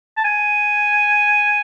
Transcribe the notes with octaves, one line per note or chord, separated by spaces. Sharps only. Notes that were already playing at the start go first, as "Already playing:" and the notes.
A5
G#5